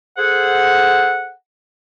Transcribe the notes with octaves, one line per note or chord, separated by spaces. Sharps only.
G#4 A4 C5 F#5